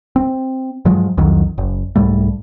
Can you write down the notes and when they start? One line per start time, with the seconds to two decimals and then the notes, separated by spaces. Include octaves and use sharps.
0.16 C4
0.85 G2 F3 F#3 G#3
1.17 C2 F2 D#3 F#3
1.58 F#1
1.96 C2 G#2 G3 A3